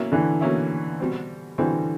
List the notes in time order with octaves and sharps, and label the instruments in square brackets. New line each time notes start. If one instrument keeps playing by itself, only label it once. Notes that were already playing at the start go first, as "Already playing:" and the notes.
Already playing: [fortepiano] B2 F#3 A#3 C#4 E4
[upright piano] D3 E3
[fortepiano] B2 F#3 A#3 C#4 E4
B2 G3 C4
[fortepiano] B2 G3 C4 [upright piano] D3 E3